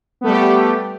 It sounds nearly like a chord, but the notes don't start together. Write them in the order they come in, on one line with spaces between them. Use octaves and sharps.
B3 A3 G3 G4